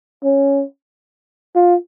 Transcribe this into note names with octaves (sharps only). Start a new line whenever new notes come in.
C#4
F4